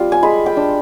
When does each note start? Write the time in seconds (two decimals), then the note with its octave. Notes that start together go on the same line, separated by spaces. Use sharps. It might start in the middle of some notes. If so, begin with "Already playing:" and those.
Already playing: G3 C4 F4
0.12 G#5
0.23 G#3 B5
0.46 G5
0.57 D4